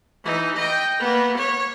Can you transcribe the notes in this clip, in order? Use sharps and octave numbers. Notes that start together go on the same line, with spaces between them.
E3 D#4
D#5 G5
A#3 B3
C#5